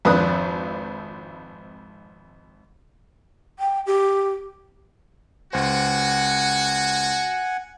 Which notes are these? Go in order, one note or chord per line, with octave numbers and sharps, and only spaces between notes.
G#1 F2 D4 B4 D#6 F#6
G5
G4
C#2 F#4 C5 F#5 G#5